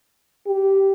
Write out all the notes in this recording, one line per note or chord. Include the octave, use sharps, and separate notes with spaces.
G4